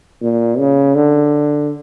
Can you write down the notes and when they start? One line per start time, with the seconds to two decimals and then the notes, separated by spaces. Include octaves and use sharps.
0.22 A#2
0.58 C#3
0.95 D3